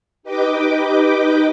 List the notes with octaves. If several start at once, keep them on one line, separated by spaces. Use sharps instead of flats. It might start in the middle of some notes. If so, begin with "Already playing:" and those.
D#4 G4 B4 D#5 G5 D6